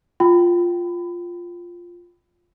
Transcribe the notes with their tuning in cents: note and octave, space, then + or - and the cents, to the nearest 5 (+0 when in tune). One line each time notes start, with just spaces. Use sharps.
F4 +0 G5 -20 B5 +25